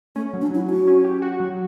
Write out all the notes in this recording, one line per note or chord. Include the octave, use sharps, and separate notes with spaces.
A3 C#4
F#3
D4
F#3 E4
C#4 F#4
C#4
G4
F#4
F#3